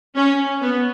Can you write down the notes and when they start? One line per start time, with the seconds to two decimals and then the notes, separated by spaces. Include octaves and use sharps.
0.16 C#4
0.62 B3